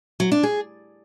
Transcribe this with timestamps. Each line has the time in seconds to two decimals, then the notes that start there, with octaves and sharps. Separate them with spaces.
0.20 F#3
0.32 D4
0.43 G#4